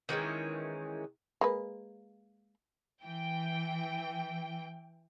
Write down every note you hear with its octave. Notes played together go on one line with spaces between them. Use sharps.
D#3 E3 G#3 C#4
G#3 A#3 B4
E3 G5